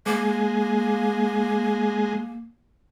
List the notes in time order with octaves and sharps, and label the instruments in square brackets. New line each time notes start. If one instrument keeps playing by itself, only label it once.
[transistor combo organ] G#3 [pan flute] A#3